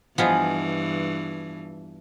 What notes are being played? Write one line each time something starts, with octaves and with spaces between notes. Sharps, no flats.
G2 E3 F3 B3 F4 G#4 D#5